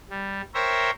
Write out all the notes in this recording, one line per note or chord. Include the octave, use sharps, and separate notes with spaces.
G3
A#4 C5 C#5 E5 G5 A#5